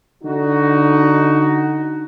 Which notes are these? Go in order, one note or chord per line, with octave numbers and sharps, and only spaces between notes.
D3 D#4 F#4